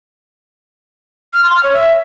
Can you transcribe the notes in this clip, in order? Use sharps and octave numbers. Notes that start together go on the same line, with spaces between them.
F6
C6
F6
C#5
E5